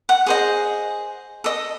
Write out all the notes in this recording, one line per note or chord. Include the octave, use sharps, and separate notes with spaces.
F#5
G#4 C5 D#5
A4 D#5